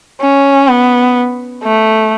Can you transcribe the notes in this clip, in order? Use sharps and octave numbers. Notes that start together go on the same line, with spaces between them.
C#4
B3
A3